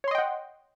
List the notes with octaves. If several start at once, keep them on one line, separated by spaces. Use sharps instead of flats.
C#5 D#5 F#5 G5 C6